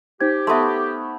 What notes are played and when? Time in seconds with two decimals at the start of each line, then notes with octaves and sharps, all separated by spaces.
0.21 D#4 G4 C5 G#6
0.47 A3 B3 E5 A5 C6